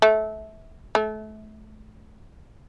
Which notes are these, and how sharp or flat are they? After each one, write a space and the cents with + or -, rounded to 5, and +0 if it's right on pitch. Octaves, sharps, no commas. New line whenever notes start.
A3 -25
A3 -30